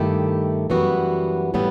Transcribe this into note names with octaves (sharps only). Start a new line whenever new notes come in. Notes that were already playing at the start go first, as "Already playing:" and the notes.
Already playing: G2 D#3 A3 E4 G4
F#2 E3 G3 B3 F#4
A2 E3 G3 B3